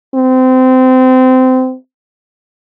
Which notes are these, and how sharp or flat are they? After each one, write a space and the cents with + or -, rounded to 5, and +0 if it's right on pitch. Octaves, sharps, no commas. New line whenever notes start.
C4 -25